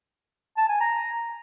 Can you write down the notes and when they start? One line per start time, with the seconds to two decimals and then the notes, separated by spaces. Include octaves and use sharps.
0.57 A5
0.69 G#5
0.81 A#5